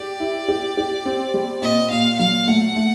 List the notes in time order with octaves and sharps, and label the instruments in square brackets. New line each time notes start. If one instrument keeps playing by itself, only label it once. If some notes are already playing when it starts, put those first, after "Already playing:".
Already playing: [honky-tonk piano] G4 [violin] D5
[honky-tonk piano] E4
G4
G4
C4
G3
[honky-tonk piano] A#2 [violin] D#5
[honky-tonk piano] A#2 [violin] F5
[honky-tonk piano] F#3 [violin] F5
[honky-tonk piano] A3 [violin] F#5
[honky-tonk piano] A3